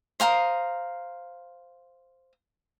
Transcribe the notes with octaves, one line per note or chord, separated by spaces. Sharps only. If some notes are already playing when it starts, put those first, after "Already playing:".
C5 F5 A#5 D#6